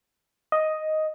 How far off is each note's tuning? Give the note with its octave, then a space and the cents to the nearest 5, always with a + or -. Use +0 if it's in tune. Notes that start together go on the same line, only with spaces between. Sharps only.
D#5 +5